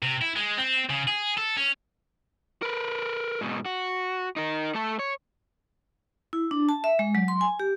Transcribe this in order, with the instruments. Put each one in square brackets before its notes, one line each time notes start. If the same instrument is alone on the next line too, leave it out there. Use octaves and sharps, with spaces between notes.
[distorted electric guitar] C3
E4
G#3
C4
C#3
G#4
A4
C#4
[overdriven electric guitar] A#4 B4
G#2 B2
F#4
D#4 A#4
A3 A4
C#5
[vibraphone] E4
D4
A5
E5
G#3
F#3
C6
G#5
G4